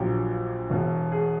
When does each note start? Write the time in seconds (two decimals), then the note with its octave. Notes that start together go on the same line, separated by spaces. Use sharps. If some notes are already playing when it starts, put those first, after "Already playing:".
Already playing: A#1 A#2 F#3 G4
0.70 E1 E2 B2
1.12 G#4